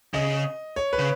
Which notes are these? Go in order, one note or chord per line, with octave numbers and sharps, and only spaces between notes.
C#3 D#5
C#5
B4
C#3